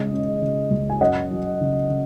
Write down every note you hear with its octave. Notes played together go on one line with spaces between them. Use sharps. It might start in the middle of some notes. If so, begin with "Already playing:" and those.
Already playing: C#3 G#3 D#5
C#4
C#3
C#2
G#5
F#2 D#5 F#5
F#3
C#3
C#3